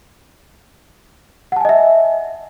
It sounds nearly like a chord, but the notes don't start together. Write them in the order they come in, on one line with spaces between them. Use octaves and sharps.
F#5 A5 G#5 D#5 E5